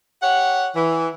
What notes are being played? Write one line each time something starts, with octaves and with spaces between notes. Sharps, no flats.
G4 C#5 F#5
E3